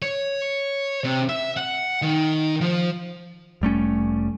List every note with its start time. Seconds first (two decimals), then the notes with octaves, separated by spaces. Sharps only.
0.02 C#5
1.04 C3
1.29 E5
1.57 F#5
2.02 D#3
2.61 F3
3.61 F1 G3 A3 C#4